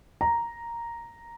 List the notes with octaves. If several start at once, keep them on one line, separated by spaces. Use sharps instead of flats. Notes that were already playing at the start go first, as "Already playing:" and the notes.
A#5